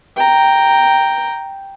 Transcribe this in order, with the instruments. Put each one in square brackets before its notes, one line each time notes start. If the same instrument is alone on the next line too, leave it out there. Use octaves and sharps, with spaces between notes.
[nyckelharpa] G5 A#5